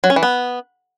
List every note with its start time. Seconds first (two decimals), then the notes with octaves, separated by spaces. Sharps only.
0.04 F#3
0.10 C#4
0.16 E3
0.23 B3